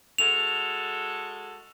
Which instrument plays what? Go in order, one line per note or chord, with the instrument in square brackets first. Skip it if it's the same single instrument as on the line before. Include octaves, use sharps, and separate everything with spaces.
[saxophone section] G#3 F#4 A4 [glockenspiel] F7